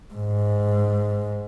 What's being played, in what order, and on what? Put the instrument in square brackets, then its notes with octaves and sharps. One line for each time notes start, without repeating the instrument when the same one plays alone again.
[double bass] G#2